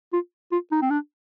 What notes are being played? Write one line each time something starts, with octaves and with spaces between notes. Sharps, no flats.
F4
F4
D#4
C4
D4